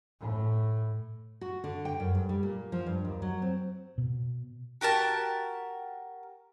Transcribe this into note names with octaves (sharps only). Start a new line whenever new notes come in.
A2
F#4
D3
G5
F#2
G2
G3
A#2
F3
G2
D#2
F#3
C4
B2
F#4 G4 A#4 A5